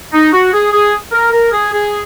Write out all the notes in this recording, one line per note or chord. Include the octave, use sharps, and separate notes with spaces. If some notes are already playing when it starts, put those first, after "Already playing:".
D#4
F#4
G#4
G#4
A#4
A#4
G#4
G#4